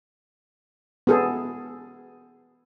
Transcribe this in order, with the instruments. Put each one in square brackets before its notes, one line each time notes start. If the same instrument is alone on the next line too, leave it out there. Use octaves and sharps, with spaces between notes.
[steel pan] B3 G#4 A4